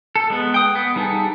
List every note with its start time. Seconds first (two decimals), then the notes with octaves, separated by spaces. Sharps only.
0.16 A4
0.30 G#3 B3
0.54 G5 D#6
0.75 B3
0.96 G3 D#4 G#4 A4